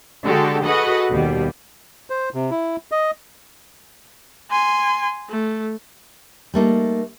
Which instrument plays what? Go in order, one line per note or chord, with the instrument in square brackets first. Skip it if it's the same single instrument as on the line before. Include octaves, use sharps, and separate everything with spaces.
[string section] D3 G#3 F#4 G4 A4
F#4 G#4 A4 B4 D#5 F#5
D#2 B2 G3
[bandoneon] C5
C3
E4
D#5
[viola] G#5 C6
A3
[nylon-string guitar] G3 A3 A#3 D#4